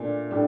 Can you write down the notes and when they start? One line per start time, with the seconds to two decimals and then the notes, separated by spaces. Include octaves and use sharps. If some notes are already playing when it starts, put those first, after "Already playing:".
Already playing: A#2 A3 D4
0.31 A2 G3 D4